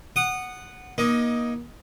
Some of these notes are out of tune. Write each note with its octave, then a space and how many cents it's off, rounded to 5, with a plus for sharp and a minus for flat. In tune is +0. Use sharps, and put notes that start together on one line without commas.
F#5 +0 D#6 -20
A#3 +35 D#4 +10